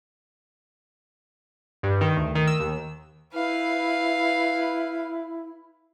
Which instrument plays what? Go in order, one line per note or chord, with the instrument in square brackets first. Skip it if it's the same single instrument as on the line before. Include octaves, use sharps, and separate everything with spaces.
[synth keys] G2
D#3
D2
D#3
E6
D#2
[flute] E4 [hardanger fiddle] B4 F5